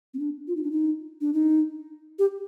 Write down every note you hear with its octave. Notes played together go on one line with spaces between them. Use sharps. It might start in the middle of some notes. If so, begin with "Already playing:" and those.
C4
D4
F4
D#4
D4
D#4
D4
D#4
G4